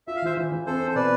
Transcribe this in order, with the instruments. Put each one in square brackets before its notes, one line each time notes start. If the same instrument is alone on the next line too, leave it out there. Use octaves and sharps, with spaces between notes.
[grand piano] F4 [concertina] E5
[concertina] F5
[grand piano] E3 [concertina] C5 E5
[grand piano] E3
E3
[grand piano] C4 [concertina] A4 C5
[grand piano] C4
[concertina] C5
[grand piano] B2 [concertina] B4 D5